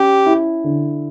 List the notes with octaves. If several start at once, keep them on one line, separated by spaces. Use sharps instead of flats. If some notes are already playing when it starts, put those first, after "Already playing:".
Already playing: C#4 G4
E4
D3